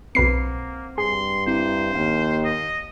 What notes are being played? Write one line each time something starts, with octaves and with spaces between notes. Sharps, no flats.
B1 A#3 C4 B4 C7
G2 G#4 C6
C4 E4 C5
D#2 F5
D#5